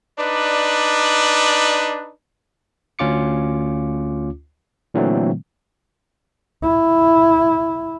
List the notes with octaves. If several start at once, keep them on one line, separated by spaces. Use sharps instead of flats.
D4 D#4 B4 D5
D2 C#4 F4 D6 C#7
A#2 D3 E3 F#3 A3 C4
E4